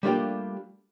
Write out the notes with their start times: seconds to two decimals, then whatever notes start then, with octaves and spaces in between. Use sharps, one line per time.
0.03 G3 A3 A#3 D4 F4 G4